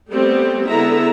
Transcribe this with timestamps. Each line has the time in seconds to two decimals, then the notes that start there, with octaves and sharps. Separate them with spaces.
0.10 G3 A3 B3 C4 G4
0.68 D3 G#3 B3 E4 E5 A#5